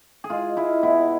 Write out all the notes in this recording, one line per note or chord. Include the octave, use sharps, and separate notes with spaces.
G#4
G#3 F4
G#3 E4
B2 E4